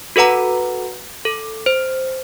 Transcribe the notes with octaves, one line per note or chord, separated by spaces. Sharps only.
F#4 A4 B4 F#5 A#5
A4
C5